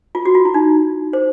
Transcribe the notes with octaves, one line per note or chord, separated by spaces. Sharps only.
F4
F#4
F4
E4
D#4
C5